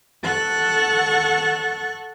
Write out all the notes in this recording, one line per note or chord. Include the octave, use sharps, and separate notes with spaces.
A4 F#5 C#6 F#6